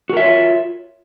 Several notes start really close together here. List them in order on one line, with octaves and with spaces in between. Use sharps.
F#4 A#4 E5 C#5 F4